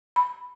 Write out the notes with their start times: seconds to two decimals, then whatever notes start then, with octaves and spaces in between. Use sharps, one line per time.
0.16 B5